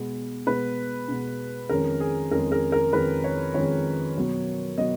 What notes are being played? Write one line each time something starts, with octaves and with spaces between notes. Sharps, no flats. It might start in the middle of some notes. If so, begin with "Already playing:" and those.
Already playing: B2 G#3 B3
B2 G#3 B3 B4
B2 G#3 B3
F2 D#3 G#3 C#4 A#4
G#4
F2 D#3 G#3 C#4 A#4
A#4
A#4
F2 D#3 G#3 C#4 B4
C#5
F2 D#3 G#3 C#4 C#5
B2 F#3 B3
B2 F#3 B3 D#5